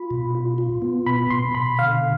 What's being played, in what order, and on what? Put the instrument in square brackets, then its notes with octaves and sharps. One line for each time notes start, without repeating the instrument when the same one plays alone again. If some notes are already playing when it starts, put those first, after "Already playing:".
Already playing: [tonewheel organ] F4 [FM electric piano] B5
[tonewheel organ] B2
F4
F4
B3
[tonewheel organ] B2 [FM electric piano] B5
[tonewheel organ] B2 [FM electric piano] C6
[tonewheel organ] B2 [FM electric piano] B5
[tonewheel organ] D3 [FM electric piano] F5